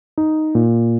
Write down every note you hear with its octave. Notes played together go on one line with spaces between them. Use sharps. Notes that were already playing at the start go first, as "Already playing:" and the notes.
D#4
A#2